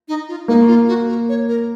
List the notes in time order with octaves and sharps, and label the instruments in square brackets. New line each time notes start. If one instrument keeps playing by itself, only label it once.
[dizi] D#4
F4
[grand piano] A#3 [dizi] D#4
[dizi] F4
F#4
A#4
C#5
A#4